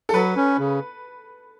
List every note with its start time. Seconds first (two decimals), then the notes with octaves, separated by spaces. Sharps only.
0.09 A4
0.14 F#3 B4
0.36 C#4
0.59 C#3